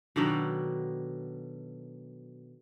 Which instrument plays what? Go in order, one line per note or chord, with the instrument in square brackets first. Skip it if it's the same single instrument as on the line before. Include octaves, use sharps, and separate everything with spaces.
[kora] B2 D3 D#3 F#3